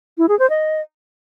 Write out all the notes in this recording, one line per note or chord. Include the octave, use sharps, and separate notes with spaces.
E4
G#4
C5
D#5